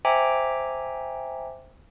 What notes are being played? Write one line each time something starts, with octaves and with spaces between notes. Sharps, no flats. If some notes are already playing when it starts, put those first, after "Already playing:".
C5 E5 G5 G#5 A#5 D6